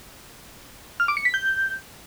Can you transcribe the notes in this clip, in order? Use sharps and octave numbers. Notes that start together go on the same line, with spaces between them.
F6
D6
C#7
B6
G6